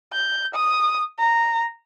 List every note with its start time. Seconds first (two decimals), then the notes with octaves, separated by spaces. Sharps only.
0.13 G6
0.55 D#6
1.19 A#5